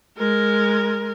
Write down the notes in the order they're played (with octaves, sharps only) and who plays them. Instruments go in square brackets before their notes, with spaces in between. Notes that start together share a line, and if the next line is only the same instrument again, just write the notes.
[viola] G#3 A#4